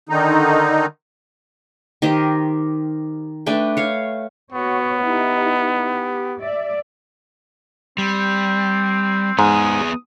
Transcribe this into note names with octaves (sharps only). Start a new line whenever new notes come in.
D3 D#3 D#4
D#3 G4 C5 D#5
A3 D4 B4 G5
C#5 F5
B3 F#4 C#5
D#4 E4 G4
G4
D5 E5
G3 C4
G#2 B3 G#4 D#6